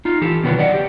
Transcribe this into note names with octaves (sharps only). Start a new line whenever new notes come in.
D#4 F4
E3 G4 A4
B2 D3 D#3 F#3 B3
F#3 D5 D#5 F#5
G4